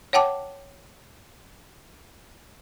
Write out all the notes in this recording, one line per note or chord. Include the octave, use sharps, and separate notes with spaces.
C#5 F#5 G5 A5 D6